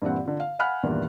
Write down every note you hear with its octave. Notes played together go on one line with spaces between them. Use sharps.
G2 A#2 E3 C4 F#5
D3 F4
F5
F5 F#5 G#5 B5 F6 F#6
E2 G2 A#2 D#3 E3